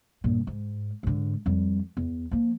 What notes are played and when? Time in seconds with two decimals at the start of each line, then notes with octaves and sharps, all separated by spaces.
0.24 G2 A#2
0.47 G#2
1.03 G#2 D3
1.46 F2 G3
1.97 E2
2.31 F3 A#3